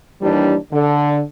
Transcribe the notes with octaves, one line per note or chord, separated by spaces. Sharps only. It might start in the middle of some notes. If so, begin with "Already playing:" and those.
D#2 E3 G3 D4
D3